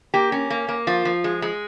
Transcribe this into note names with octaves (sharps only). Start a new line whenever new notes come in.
A#3 G4
C#4
A#3
A#3
F3 F4
F3
G#3
G#3